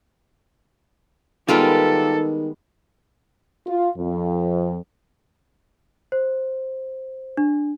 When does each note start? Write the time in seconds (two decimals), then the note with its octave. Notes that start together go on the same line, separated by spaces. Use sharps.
1.48 D#3 G3 G#3 B3 F4 G4 A4 A#4
3.66 F4
3.96 F2
6.12 C5
7.37 D4